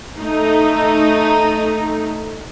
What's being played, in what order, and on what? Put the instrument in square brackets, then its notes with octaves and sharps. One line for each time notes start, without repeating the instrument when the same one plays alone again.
[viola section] A3 D#4